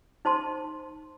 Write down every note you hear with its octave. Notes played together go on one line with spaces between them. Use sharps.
D#4 C5 A5 C6